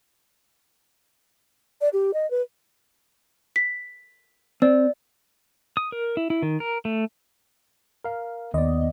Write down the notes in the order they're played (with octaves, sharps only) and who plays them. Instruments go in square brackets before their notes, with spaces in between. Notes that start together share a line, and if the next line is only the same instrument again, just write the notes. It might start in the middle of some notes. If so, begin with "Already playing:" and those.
[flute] D5
G4
D#5
B4
[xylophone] B6
[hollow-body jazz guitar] C4 [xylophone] D5
[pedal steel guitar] D#6
A#4
E4
E4
D#3
A#4
A3
[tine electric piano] A#4 F5
[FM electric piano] D#2 D#5 [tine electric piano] D#3 D5 [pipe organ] B3